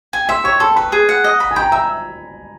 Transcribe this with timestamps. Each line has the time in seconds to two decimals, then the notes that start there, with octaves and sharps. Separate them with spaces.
0.13 G5 G#5
0.29 E5 C6
0.44 C#5 C#6
0.60 A4 C6
0.76 B4 B5
0.92 G#4
1.09 F#5
1.24 D#5
1.40 B5
1.51 G#5
1.56 G5 B5
1.62 A#5
1.72 E5 A#5